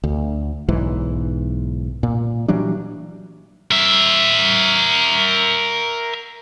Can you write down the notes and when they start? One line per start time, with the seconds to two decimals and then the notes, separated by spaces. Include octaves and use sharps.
0.04 D2
0.69 B1 G#2 E3
2.03 A#2
2.48 E3 F#3 G3 D4
3.71 A#4 E5